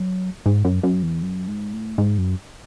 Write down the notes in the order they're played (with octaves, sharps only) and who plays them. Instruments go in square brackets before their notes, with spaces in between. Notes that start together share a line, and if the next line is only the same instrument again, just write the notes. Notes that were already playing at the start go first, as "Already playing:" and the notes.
Already playing: [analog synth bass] F#3
G#2
F#2
F#2
E2
F#2
G#2
A2
G#2
F#2